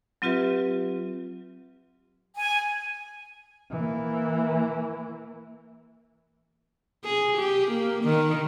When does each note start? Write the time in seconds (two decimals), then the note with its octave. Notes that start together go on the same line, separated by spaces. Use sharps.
0.22 F#3 C4 F4 G4 B4 E5
2.35 G#5
3.71 E3 A#3
7.05 G#4
7.37 G4
7.71 A#3
8.04 D#3